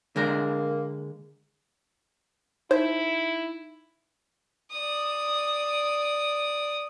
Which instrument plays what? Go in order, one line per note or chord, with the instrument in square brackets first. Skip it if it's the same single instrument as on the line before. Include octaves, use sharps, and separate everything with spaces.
[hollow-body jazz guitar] D3 G#3 A#4 [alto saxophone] A#3
[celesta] D#4 [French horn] E4 [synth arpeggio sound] C5 G#6 B6
[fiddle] D5 D#6